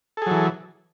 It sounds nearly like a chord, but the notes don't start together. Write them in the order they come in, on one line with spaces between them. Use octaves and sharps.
A4 G#4 F#3 E3